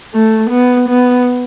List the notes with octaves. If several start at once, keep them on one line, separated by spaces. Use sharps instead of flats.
A3
B3
B3